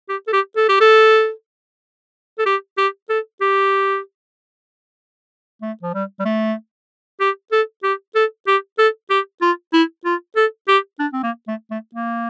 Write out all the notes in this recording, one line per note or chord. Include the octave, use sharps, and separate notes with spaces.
G4
A4
G4
A4
G4
A4
A4
G4
G4
A4
G4
A3
F3
G3
G3
A3
G4
A4
G4
A4
G4
A4
G4
F4
E4
F4
A4
G4
D4
C4
A#3
A3
A3
A#3